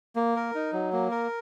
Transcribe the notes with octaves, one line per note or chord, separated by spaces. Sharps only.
A#3
A#4
D#4
F#3
A#3
A#4